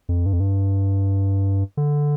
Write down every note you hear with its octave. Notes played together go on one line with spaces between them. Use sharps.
F2
G2
F2
G2
D3